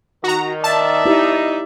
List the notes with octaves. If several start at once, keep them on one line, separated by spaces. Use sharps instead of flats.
D#3 F#4 A#5
D5 E5 A5
D#4 E4 G4 B4